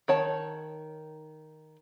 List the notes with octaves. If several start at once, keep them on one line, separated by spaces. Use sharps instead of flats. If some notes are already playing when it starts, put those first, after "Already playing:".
D#3 C#5 A5